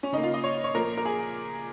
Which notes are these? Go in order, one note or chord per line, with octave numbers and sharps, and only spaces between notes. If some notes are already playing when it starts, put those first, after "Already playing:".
C#4
C#3 A#3 D#4
F4
D#5
C#5
C#5
A#2 F3 A#3 A#4
A#4
G#4